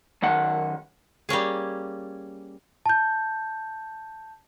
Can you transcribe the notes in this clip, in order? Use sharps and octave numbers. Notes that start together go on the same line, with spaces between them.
F#2 D#3 F#5
G3 A#3 C#4 G#4
A5 G6